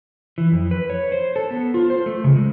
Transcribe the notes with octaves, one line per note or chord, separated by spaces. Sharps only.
E3
F2
B4
C#5
C5
A4
B3
F4
C5
A3
C#3
G#3